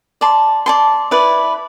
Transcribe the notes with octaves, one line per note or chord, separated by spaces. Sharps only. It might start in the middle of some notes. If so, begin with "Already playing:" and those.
D5 A5 C6
D5 A5 C6
E4 B4 D5